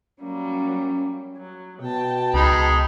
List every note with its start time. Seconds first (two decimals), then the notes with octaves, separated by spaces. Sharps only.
0.21 F#3 G3 A#3 C#4
1.39 F#3
1.82 B2 G5 A5
2.34 C#2 G#3 D#4 B5